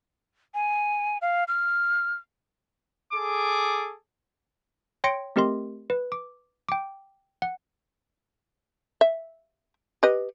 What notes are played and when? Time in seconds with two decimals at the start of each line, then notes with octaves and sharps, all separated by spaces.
0.54 G#5
1.22 F5
1.48 F6
3.12 G#4 A4 D6
5.04 C#5 G5 C6 A#6 C#7 D7
5.36 A3 C4 G4 A#4 D#5 C6
5.90 B4
6.12 D6
6.69 G5 D6
7.42 F#5
9.01 E5
10.03 G4 B4 D#5